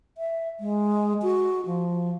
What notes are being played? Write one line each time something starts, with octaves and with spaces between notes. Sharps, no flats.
E5
G#3
F#4
F3